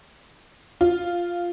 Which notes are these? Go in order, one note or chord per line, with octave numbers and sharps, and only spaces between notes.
F4